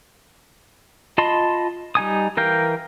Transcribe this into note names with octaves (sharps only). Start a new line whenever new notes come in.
F4 D#5 A5 B5 C6
G3 D#4 G#5 D#6
E3 A#4 F5 G5